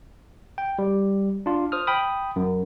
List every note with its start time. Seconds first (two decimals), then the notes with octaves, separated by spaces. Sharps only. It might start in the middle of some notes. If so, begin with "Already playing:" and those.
0.58 G5
0.79 G3
1.46 D4 F4
1.72 C5 D#6 F6
1.87 G5 B5 D#6
2.36 F#2